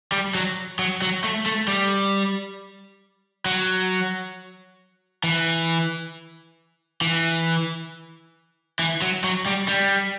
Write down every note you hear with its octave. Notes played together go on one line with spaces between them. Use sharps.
G3
F#3
F#3
F#3
A3
A3
G3
F#3
E3
E3
E3
F#3
F#3
G3
G3